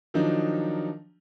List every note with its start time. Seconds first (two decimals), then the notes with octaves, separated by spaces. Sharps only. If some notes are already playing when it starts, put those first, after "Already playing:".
0.14 D#3 F3 F#3 D4 D#4